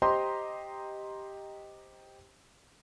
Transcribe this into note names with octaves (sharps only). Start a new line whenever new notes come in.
G4 C5 D#5 A#5 C6